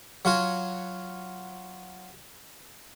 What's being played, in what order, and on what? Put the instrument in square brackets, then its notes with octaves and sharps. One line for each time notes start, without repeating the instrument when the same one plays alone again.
[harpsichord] F#3 F4 F#4 G#5